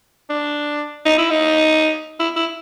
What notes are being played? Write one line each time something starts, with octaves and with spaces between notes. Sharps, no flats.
D4
D#4
E4
D#4
E4
E4